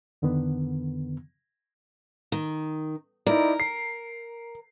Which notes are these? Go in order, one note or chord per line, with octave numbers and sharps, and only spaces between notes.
F2 D3 D#3 B3
D#3
D#4 E4 A#4 D5
C7